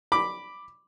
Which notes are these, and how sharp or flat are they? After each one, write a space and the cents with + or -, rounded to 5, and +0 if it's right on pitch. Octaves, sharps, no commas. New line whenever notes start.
B5 +0 D6 +0